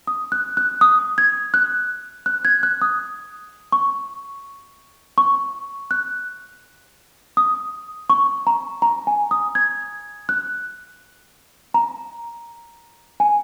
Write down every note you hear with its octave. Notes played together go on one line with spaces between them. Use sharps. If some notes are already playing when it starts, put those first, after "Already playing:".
D#6
F#6
F#6
D#6
G#6
F#6
F#6
G#6
F#6
D#6
C#6
C#6
F#6
D#6
C#6
A#5
A#5
G#5
D#6
G#6
F#6
A#5
G#5